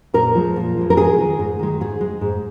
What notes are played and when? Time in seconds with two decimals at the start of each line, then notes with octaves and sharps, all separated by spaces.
0.14 A#2 A#4
0.35 F3 G#3
0.56 A#2
0.77 F3 G#3
0.90 A#4
0.97 G#2 G#4
1.18 D#3 G#3
1.39 G#2
1.59 D#3 G#3
1.81 G#2 G#4
2.01 G#3
2.21 G#2